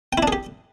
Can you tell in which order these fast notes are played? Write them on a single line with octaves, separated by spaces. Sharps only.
G5 E4 D4 G#4 G4